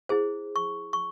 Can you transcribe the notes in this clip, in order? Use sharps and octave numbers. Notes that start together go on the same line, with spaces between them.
E4 G#4 C5
C#6
C#6